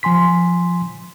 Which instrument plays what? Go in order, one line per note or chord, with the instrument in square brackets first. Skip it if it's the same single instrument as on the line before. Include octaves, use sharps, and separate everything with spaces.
[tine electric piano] F3 G#5 C6 B6